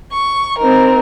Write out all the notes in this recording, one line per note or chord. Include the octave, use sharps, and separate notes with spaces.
C#6
C4 D#4 A#4